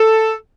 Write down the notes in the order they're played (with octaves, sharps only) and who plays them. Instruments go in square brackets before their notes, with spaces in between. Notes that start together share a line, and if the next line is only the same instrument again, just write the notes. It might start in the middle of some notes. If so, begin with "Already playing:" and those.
Already playing: [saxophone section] A4